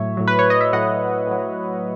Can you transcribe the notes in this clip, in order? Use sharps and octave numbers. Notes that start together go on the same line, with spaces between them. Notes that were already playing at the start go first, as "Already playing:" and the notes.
Already playing: A2 F#3 C#5 E5
A2 F#3
B4
C#5
D#5
E5
A2 F#3 D#5 F#5
A2 F#3